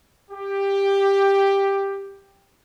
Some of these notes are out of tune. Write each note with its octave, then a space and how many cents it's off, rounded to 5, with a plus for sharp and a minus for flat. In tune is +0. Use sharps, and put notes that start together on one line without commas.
G4 +10